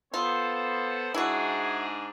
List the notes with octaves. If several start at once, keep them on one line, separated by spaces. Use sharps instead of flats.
B3 F4 A4 C5
G#2 D4 E4 F#4 G#4